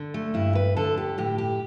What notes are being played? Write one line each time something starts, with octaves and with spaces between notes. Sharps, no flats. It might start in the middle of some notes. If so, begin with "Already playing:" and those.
Already playing: D3
A3
G2 E4
B4
D3 A4
G4
A2 G4
G4